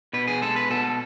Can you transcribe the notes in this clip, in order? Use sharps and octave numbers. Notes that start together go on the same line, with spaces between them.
B2 B4
G#4
G#3 A4
B4
B2 A4